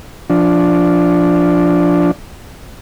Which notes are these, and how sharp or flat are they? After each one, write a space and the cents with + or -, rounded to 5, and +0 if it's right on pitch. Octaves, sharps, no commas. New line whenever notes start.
F3 +0 D4 +0